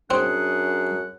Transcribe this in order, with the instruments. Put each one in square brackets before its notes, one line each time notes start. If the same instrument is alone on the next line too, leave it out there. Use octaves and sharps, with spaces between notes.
[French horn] F#2 [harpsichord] C4 [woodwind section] D4 G#4 [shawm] F#5